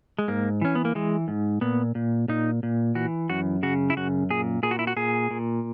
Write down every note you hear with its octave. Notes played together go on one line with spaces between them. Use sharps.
G#3
G#2 A#3
E3 C#4
B3
A#3
E3 G#3
G#2
A#2 B3
A#2
A#2 D#4
A#2
E3 F#4
F#2 F#4
C#3 F#4
E4
F#2 F#4
A#2 G#4
A#2 G#4
F#4
E4
F#4
A#2 G#4
A#2